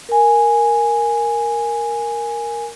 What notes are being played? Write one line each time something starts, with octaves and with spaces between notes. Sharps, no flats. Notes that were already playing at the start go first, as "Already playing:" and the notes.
A#4 G#5